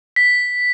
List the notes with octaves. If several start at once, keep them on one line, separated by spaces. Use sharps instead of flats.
B6